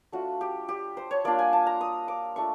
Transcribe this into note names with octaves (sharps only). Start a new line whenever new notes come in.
A3 D4 F4 F#4
G4
G4
C5
C#5
G3 A#3 D4 F4 D5
G#5
A5
A#5
D#6
D6
A3 D4 F4 C#6